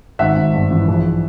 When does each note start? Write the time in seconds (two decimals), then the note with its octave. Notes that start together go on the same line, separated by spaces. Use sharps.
0.19 G#1 E5 F#5
0.36 G#1
0.54 G2
0.71 E3
0.88 A#1